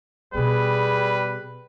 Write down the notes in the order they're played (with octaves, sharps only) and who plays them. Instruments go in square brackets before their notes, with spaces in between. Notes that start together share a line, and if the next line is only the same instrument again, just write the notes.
[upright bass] B2 B3 [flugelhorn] G3 [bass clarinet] G#4 [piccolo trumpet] B4